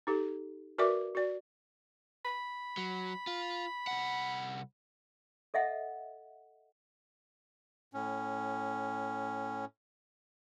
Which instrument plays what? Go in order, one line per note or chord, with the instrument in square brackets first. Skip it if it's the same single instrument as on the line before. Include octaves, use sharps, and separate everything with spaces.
[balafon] D#4 G4 A4
F#4 A#4 B4 D5 E5 D6
F#4 D5
[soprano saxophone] B5
[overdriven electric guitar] F#3
F4
C2 F#5
[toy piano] A4 D#5 E5 F#5
[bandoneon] A2 C#4